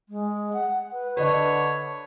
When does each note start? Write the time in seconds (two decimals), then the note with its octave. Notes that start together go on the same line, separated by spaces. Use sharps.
0.09 G#3
0.53 F#5
0.92 B4
1.17 D3 B4 C#5 D#5